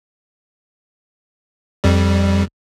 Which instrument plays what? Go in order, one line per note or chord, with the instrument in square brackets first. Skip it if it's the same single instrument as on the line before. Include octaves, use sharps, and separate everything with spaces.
[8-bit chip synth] F2 G3